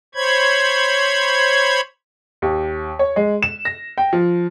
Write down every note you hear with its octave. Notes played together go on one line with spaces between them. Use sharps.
C5 C#5 B5 G#6
D#2
C#5
G#3
E7
A#6
G5
F3